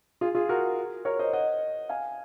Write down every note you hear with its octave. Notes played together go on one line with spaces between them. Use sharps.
F4 G#4
F4 G#4
F#4 A#4
A#4 C#5
C5 D#5
D#5 F#5
F5 G#5